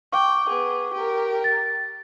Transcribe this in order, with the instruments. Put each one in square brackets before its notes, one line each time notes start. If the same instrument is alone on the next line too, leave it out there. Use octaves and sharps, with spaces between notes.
[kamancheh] G5 [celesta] C#6 D6
[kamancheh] B3 G#4
G4 A#4
[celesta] A6